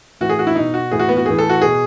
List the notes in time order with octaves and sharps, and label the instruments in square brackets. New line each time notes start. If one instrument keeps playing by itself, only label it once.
[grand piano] A2 E3 F#4
G#4
F#4
E4
B2 D#4
F#4
A2 E3 G#4
F#4
B3
F#4
A2 E3 G#4
A4
F#4
B2 G#4